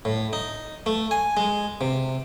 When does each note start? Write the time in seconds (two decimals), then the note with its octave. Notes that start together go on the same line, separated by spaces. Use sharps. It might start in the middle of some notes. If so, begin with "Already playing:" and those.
0.05 A2
0.33 D#4
0.86 A3
1.11 G#5
1.37 G#3
1.81 C3